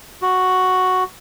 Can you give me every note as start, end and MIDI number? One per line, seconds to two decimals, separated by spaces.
0.22 1.04 66